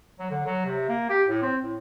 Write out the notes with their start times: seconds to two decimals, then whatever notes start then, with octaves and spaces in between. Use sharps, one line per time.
0.19 F#3
0.31 D3
0.46 F#3
0.66 C3
0.88 A#3
1.09 G4
1.28 A2
1.42 C4
1.64 A2